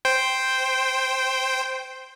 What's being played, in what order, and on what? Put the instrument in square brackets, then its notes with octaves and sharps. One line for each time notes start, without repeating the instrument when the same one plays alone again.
[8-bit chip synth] C5 G5